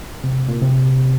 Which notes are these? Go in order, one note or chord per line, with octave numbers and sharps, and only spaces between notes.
C3
A#2
C3